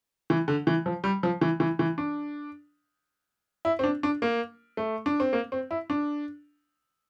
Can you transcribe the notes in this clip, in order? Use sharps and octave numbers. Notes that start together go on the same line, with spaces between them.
E3
D3
E3
F3
G3
F3
E3
E3
E3
D4
E4
C4
D4
D4
A#3
A3
D4
C4
A#3
C4
E4
D4